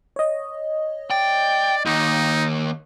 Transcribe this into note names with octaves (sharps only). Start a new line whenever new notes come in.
C#5 D#5
D5 G5
D#2 D#4